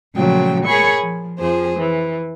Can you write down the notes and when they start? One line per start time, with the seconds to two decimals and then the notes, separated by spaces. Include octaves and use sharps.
0.16 A#2 C#3 F3 F#3 A3 G5
0.66 G#4 A#4 C#5 G#5 B5 C#6
1.00 F3
1.37 F2 F3 G#4 C5
1.78 E3